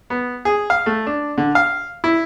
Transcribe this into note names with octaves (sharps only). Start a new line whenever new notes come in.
B3
G#4
F5
A3
D4
D3
F5
E4